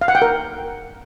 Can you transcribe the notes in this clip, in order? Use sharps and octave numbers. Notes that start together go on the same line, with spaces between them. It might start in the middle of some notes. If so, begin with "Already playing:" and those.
F5
F#5
G5
A#4